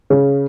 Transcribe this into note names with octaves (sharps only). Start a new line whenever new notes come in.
C#3